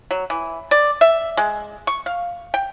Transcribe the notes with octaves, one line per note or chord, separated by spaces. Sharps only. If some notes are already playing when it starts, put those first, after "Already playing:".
F#3
E3
D5
E5
G#3
C#6
F5
G5